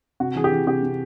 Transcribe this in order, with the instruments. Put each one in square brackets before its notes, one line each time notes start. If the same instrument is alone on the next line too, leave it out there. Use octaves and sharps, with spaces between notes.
[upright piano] C3 F#4
E3 G#4
G4
E3
C3 G4
C3